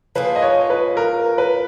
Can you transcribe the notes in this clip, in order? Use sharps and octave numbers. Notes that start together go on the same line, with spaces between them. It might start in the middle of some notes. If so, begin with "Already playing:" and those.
F3 A#3 F4 G#4 B4
D#5
C#5
B4
A#4
B4